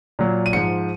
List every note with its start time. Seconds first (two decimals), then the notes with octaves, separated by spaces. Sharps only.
0.19 A#2 F#3
0.46 D#7
0.53 G#2 F3 C#7